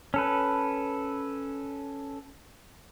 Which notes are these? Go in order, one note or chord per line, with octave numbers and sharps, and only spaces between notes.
C#4 A4 B4